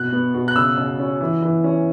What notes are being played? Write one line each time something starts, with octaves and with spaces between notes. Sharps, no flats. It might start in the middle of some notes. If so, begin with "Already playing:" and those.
Already playing: B2 F#6
B3
B2
F#6
C#3 E6
C#3
C#4
E3
E3
C#4